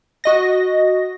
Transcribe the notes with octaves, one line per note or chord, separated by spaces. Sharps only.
F#4 D#5 A#6